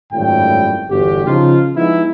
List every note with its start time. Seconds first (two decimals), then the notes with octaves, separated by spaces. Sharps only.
0.13 G#1 F#2 A2 G3 F4 G5
0.90 G1 E2 F#4 G4
1.27 C#3 F3 D#4 F4
1.76 F3 G#3 B3 D#4 E4